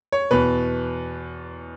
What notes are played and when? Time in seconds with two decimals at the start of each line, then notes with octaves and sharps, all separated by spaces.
0.12 C#5
0.31 E2 B2 B4